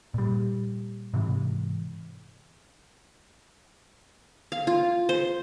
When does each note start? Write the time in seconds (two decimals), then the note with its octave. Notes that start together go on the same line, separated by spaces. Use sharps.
0.14 A#2 G3
1.14 G#2 C3 E3
4.52 F5
4.67 F4
5.09 C5